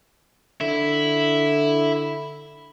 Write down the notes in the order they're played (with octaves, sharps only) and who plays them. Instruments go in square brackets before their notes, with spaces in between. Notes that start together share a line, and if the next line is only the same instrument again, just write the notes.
[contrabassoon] D3 [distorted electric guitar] E4